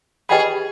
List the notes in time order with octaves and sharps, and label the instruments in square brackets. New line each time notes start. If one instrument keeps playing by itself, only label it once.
[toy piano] G4 B4 D#5 G5 B5 [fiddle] G#4